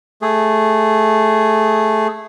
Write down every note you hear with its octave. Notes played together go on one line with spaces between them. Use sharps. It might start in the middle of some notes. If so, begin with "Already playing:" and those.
A3 G#4